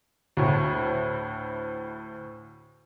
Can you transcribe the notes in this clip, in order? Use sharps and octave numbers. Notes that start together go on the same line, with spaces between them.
D2 A2